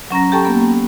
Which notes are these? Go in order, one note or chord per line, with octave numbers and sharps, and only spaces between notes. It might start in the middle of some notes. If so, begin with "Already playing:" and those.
F#3 C#4 A#5 A#6
G4 A4 G5 A5 C#6
A#3 B3